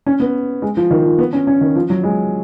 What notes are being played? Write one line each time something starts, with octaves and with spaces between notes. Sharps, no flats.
C#4
B3
G#3
F3
D#3
F3
B3
C#4
C#4
D#3
F3
F#3
G#3